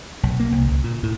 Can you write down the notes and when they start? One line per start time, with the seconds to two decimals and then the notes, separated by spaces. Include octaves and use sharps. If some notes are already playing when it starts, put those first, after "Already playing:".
0.23 B1
0.40 A#3
0.52 C2
0.67 C#2
0.84 A#2
1.03 A2